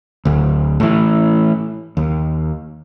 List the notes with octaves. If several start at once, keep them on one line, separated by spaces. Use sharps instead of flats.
D1 D2
A2 E3
D#2